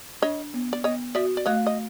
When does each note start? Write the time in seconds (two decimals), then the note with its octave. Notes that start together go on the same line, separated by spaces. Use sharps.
0.22 D4 C#5 D#5
0.54 B3
0.73 D5
0.84 B3 C#5 D#5
1.15 F#4 D5 E5
1.37 D5
1.46 A3 C#5 D#5
1.67 D#5